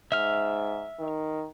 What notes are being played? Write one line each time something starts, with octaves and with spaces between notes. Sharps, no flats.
G#2 E5 F6
D#3